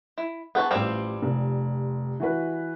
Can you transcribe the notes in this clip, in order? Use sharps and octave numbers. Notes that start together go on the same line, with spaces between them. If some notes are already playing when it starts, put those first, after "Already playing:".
E4
B3 G#4 G5 A5 C#6
A1 F3 G3 C4 D6 E7
F1
E3 F#4 B4